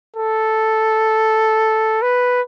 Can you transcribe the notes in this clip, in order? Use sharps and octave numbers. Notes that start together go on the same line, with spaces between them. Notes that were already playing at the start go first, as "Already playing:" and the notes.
A4
B4